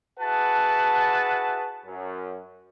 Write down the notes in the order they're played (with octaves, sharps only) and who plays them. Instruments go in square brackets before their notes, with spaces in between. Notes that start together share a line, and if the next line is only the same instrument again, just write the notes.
[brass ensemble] E4 F#4 G#4 B4 F#5 A5
F#2